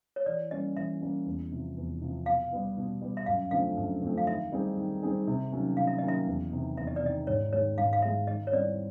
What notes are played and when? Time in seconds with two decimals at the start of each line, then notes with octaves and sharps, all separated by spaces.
0.16 C#5
0.26 E3 D5
0.51 G3 A#3 C#4 D#5
0.77 E3 E5
1.01 G3 A#3 C#4
1.26 E2
1.52 C3 F3
1.77 E2
2.02 C3 F3
2.26 B2 F5
2.52 G3 B3
2.77 B2
3.01 G3 B3
3.17 E5
3.26 F#2 F5
3.51 D3 F3 A3 C4 F5
3.77 F#2
4.01 D3 F3 A3 C4
4.18 F5
4.27 D#3 E5
4.52 G3 C4 D#4 G#4
4.77 D#3
5.03 G3 C4 D#4 G#4
5.27 C3
5.52 D#3 F#3 A#3 C#4
5.77 C3 F5
5.87 E5
5.98 D#3 F#3 A#3 C#4 D#5
6.08 E5
6.27 E2
6.52 C3 D#3
6.77 E2 E5
6.87 D#5
6.96 D5
7.02 C3 D#3 D#5
7.27 G#2 C#5
7.53 D#3 G#3 C#5
7.78 G#2 F5
7.93 F5
8.02 D#3 G#3 E5
8.27 D#3 D#5
8.47 C#5
8.52 G3 C4 E4 D5